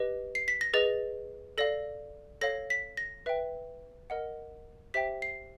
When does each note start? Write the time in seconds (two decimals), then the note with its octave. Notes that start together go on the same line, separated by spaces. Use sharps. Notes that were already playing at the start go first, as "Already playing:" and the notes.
Already playing: G4 B4 D#5
0.35 C7
0.48 B6
0.61 A#6
0.73 G#4 B4 D#5 A6
1.58 A4 D5 F5 A#6
2.41 A4 C#5 F5 A#6
2.70 B6
2.97 A#6
3.26 B4 E5 G5
4.10 A#4 D#5 F#5
4.94 G4 C5 E5 G5 B6
5.22 C7